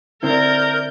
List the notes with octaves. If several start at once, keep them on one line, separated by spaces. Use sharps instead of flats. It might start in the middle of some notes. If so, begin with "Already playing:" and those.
D3 C4 E4 A#4 D5 G6